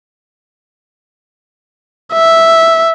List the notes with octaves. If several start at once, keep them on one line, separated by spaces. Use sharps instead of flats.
E5